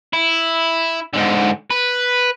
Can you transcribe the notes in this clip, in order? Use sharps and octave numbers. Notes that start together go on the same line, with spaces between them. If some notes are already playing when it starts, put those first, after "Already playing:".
E4
G#2 D3
B4